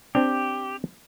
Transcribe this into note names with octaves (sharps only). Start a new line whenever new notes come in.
C4 D4 G4